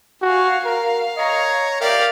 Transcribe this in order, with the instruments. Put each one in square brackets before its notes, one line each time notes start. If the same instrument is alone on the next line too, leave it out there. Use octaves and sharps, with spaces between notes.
[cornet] F#4 [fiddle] F5 G#5
[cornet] A#4 [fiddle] F5
[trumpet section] C#5 A#5 [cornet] D#5
[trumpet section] G4 F5 [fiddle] A#4 D5 [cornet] E5